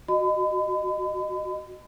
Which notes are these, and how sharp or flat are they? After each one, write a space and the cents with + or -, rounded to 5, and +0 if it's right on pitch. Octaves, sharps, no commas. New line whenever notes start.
F#4 -5 D#5 -20 B5 +40